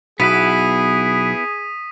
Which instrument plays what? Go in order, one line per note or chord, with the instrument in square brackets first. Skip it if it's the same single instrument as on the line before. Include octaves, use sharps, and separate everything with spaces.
[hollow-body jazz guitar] B1 [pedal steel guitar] B3 E4 B4 [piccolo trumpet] G#4 [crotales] D#6 B6 D#7